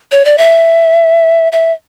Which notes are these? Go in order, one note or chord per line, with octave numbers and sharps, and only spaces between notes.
C#5
D5
E5
E5